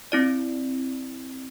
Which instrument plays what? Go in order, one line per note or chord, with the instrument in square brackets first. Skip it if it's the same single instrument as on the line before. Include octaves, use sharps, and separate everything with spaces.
[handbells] C4 E4 D5